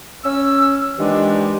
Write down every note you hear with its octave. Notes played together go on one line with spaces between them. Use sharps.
C#4 E6
A#2 D#3 E3 G#3 D4 G4